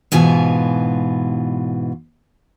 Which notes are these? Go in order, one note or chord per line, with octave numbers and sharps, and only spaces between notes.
G#2 B2 E3 F4 G#5